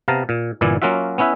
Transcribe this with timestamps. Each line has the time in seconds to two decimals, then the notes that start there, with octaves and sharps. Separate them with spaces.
0.08 C3 B3 F5 A5 A#5
0.29 A#2
0.61 G1 A#2 E3 E4 D5 G#5
0.82 F#3 A#3 C#4 F4 F#4 E5
1.18 B3 C#4 E4 B4 E5